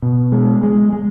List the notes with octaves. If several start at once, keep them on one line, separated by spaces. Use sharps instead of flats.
B2
G#3
G#3
G#3